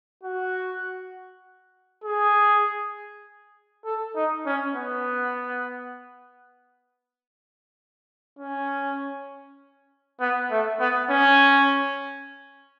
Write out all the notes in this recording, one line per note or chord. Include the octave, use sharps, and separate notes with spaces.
F#4
G#4
A4
D#4
C#4
B3
C#4
B3
A3
B3
C#4